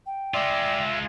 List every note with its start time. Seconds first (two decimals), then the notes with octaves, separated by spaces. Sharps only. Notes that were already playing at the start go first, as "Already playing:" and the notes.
0.06 G5
0.34 G#3 F4 D5 E5